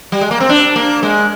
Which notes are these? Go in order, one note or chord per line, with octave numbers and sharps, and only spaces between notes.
G3
G#3
A#3
C4
D4
A#3
G#3